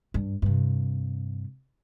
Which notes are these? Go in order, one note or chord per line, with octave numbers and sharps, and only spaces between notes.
G2
G2 C3